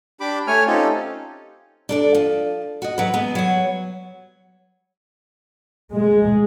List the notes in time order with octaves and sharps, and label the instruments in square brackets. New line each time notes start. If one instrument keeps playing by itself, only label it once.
[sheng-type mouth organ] D4 G4 B5 D6
A3 C#5 G#5 F6
C4 C#4 D#4 F4 G4 A4
[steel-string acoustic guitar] D4 A4 D5
F3
F#4 D#5
F#3 B4
G#3 B3
F#3 B4 C#5
[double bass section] G#3